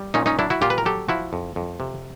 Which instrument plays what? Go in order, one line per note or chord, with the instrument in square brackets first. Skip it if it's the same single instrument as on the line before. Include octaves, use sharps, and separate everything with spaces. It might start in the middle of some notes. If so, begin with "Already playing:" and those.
Already playing: [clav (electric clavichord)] G3
A#2 C#4 D#4
C#4 D#4
F#3 D4 E4
E4 F#4
A#2 F4 G4
B4
A#4
F#3 G4 A4
F3 E4 F#4
F2
F2
C3